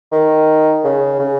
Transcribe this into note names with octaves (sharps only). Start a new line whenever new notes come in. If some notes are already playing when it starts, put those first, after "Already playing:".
D#3
C#3
C#3